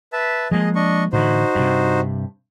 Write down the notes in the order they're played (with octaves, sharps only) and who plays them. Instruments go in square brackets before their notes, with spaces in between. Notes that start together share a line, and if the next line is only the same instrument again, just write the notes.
[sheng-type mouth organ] B4 E5 A5
[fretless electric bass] F3 G#3 A#3 [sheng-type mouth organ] G#4 D#5
[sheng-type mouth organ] D4 D#5 C#6
[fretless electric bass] A2 D3 E3 [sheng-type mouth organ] D#4 F#4 C5
[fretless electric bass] G2 C3